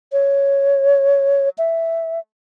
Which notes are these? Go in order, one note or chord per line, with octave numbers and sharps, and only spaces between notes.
C#5
E5